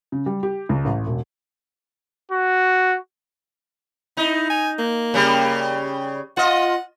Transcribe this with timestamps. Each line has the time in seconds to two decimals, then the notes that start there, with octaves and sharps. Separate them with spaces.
0.12 C#3
0.26 G3
0.43 G4
0.69 C#2
0.85 A1
1.07 E1
2.31 F#4
4.17 D#4 E4
4.50 G#5
4.79 A#3
5.14 C#3 G3
6.37 F4 D#5 F#5